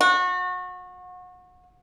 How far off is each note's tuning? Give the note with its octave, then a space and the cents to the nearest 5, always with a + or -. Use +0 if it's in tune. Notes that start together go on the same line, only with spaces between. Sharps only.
F#4 -30